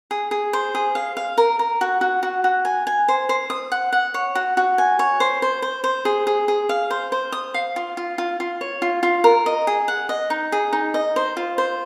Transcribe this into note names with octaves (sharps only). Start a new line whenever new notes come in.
G#4
G#4
C5
G#4
F5
F5
A#4
A#4
F#4
F#4
F#4
F#4
G#5
G#5
C5
C5
D#6
F#5
F#5
C#5
F#4
F#4
G#5
C#5
C5
C5
C5
C5
G#4
G#4
G#4
F5
C5
C5
D#6
F5
F4
F4
F4
F4
C#5
F4
F4
A#4
D#5
G#4
F#5
D#5
D#4
G#4
D#4
D#5
C5
F4
C5